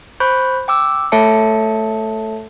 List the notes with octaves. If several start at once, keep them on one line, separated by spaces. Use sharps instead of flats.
C5 B5 C#6 F#6 G6
G5 D6 E6
A3 A4 C#5 E5 A5 C#7